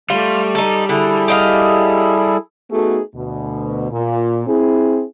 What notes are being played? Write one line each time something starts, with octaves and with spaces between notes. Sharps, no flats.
G3 A3 F4
D#4 A4
D3 E4 G#4 A4
G4 D#5 F5
A3 B3 D#4 F#4 G#4 A4
D2 B2
A#2
C4 E4 G#4